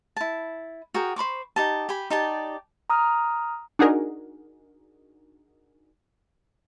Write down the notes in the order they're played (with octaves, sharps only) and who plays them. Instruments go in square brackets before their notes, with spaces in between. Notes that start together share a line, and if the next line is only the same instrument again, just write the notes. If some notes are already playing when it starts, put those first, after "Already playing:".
[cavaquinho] E4 A5
F#4 G#4 A#4 G5
C5 B5 C#6 D6
D#4 G4 A5
G4 G#5 B5
D#4 G4 D5 A5
[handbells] A#5 D#6 F6
[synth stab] D4 D#4 F#4 G#4 A#4